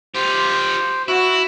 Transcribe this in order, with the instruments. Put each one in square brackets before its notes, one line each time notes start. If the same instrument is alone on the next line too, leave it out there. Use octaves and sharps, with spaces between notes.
[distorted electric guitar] F4 G4 [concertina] C5
[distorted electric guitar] E4 [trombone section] F#4